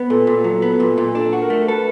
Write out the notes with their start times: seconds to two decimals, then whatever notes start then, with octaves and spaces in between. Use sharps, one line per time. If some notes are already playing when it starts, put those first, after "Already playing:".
Already playing: B3
0.10 A#2 A4
0.27 A#2
0.44 F#3
0.62 B3
0.80 A#2
0.98 A#2
1.15 D4 A4
1.33 F#4
1.42 A#4
1.50 A3
1.67 A4 B4